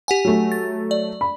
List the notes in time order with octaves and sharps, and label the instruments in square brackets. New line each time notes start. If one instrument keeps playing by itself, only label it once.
[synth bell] G4 F#5 G#5
[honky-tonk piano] F#3 A3
[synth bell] A6
D5
[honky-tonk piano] B5